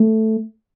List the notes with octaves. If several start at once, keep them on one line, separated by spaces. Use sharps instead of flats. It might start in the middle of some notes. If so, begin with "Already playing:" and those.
Already playing: A3